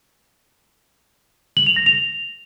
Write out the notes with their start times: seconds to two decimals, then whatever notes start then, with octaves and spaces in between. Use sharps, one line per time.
1.57 F#7
1.67 F7
1.76 A#6
1.86 F7